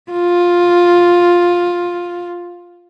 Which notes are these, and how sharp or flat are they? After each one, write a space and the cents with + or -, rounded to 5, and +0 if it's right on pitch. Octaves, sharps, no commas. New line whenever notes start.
F4 +10